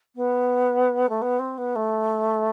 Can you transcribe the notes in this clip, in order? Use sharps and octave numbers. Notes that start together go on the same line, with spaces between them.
B3
A3
B3
C4
B3
A3